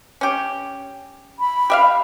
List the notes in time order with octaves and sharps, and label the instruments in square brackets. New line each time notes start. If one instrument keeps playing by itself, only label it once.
[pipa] C#4 G4
[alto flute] B5
[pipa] G4 E5 F5